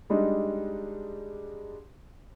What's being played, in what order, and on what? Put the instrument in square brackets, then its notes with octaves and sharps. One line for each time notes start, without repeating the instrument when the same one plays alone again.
[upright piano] G3 G#3 D4 D#4